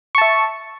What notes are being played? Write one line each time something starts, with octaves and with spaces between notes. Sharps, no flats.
E5 A5 C#6